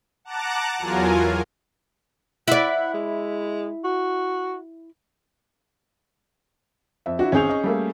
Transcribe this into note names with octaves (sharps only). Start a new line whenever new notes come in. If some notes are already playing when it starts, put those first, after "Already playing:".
F#5 A5 A#5 D6 F#6
E2 F#3 F4 A#4 G#5
E4 D5 F#5
G#3
F#4
F2 E5
D4 E4 F#4
G#1 C4 C#4 G#4 G6 F7
D#5 C#6
G3 A3 A#3